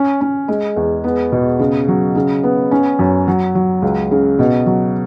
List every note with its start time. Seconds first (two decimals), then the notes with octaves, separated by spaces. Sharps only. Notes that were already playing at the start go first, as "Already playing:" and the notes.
Already playing: C#4
0.21 C#4
0.48 G#3
0.76 E2
1.04 B3
1.32 B2
1.59 C#3
1.88 F#3
2.15 C#3
2.43 B3
2.71 C#4
2.99 F#2
3.28 F#3
3.55 F#3
3.82 C#2
4.11 C#3
4.39 B2
4.66 F#3